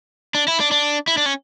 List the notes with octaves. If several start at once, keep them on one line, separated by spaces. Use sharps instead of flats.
D4
E4
D4
D4
E4
D4
C#4